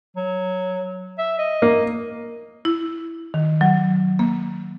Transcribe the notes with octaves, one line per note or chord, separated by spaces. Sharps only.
F#3
E5
D#5
A#3
E4
D#3
F#3
A#3